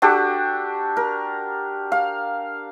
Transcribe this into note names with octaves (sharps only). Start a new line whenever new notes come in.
D4 F#4 G4 A4
A#4
F5